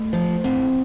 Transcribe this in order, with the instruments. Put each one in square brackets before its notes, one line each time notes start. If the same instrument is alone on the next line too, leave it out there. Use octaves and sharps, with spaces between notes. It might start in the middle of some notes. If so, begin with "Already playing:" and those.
Already playing: [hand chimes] A3
[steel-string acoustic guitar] F3 [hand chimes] C5
[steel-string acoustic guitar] A2 [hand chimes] C4